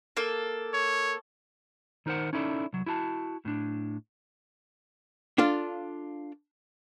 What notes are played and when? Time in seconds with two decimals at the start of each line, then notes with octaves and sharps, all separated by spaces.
0.17 A#3 A4
0.74 C#5
2.06 D#3 D#4 A#4 C5 F#5
2.33 C#4 D#4 E4 A4 D5
2.73 C2 F#3
2.86 E4 F#4 G#5 A5
3.45 A2 D4
5.38 D4 F4 A4 F5